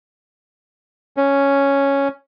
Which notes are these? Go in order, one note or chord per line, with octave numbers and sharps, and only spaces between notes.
C#4